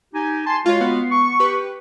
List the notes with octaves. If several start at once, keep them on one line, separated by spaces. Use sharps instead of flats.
D#4 G4 G#5
G#5 A5 C6
G#3 F4 F#4 C#5 F5
B3
C#6
G4 B4